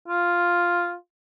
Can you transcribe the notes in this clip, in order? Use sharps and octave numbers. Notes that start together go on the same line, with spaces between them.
F4